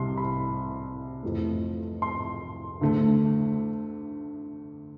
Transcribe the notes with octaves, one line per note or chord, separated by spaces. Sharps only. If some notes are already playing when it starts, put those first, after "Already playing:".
Already playing: C2 C3 G3 C6
B5
F2 E3 A3
C6
D2 D3 A3